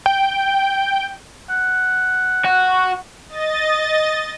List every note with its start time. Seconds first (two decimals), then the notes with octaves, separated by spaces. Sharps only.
0.06 G5
1.50 F#5
2.45 F#4
3.29 D#5 A6